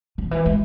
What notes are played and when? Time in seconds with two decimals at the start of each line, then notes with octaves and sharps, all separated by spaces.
0.18 D#3
0.31 E3
0.46 G#3